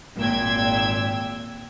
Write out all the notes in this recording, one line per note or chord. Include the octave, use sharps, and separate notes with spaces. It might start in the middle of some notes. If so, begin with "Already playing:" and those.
G#1 A#2 G5 E6 G#6